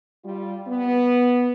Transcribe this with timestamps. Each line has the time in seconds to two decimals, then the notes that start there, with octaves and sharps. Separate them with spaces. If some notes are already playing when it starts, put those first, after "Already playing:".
0.23 G3 F4
0.66 B3